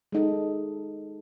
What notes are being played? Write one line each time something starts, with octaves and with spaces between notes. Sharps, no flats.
G#3 D#4 A4